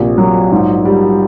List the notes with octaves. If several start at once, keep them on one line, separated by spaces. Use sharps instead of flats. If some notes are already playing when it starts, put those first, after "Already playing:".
Already playing: A#1 C3
F#3
G#2
G3